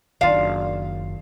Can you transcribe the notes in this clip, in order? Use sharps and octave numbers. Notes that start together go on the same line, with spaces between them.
F#1 D#3 D4 F4 F5